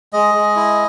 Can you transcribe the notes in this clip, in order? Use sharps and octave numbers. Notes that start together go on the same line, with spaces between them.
G#3 D#5
G#3
E4